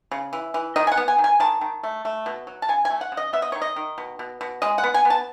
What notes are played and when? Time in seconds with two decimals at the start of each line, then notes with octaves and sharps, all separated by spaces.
0.11 C#3
0.33 E3
0.54 E3
0.76 D#3 D#5
0.87 G#5
0.92 F#5
0.97 B3
1.08 G#5
1.18 D#3
1.24 G#5
1.40 D#3 A5
1.61 D#3
1.83 A3
2.05 A3
2.26 B2
2.47 F#3
2.62 A5
2.69 C#3 G#5
2.85 G#5
2.90 A3
3.01 F#5
3.12 C#3
3.17 D#5
3.33 B3 E5
3.42 D#5
3.52 D#3 C#5
3.61 D#5
3.76 D#3
3.98 B2
4.19 B2
4.41 B2
4.62 G#3 D#5
4.78 F#5
4.84 B3
4.94 G#5
5.05 B3
5.10 A5